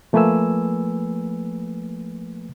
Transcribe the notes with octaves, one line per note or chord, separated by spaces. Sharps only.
F3 A3 A#3 B4 G#5 E6